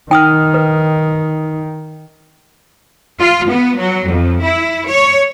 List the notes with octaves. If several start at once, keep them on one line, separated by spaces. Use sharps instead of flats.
D#3 D#4 F#5 G5 D#6 F6
B4
F4
B3
F#3
F2
E4
C#5